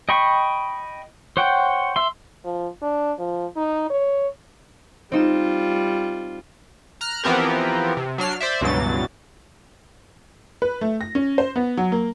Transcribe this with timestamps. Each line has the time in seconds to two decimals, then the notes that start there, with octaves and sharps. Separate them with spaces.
0.09 D#5 G5 B5 C#6
1.37 C5 C#5 F#5 G5
1.96 E5 C6
2.44 F3
2.82 D4
3.19 F3
3.57 D#4
3.90 C#5
5.12 G3 C4 D#4 F4 E7
7.01 A#5 F6 F#6
7.24 E3 F3 B3 C4 G4 A#4
7.97 C3
8.18 F#3 D4 F6 C7
8.40 C5 D5 E5
8.61 C#2 G2 B2 E3 F#3 A6
10.62 B4
10.81 A3
11.01 A#6
11.15 C#4
11.38 C5
11.56 B3
11.77 F#3
11.92 A#3